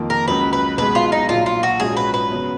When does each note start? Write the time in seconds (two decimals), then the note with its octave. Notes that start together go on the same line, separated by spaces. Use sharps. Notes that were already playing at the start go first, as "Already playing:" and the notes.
Already playing: F2 D#3 A#3 F4
0.10 A#4
0.27 C#2 C#3 F#3 B4
0.53 B4
0.77 B1 B2 G#3 B4
0.95 F4
1.12 D#4
1.28 A#1 A#2 F#3 F4
1.46 F4
1.63 F#4
1.80 A#1 G#2 F#3 C#4 F4 G#4
1.97 B4
2.14 B4
2.30 C#3 F#3 B3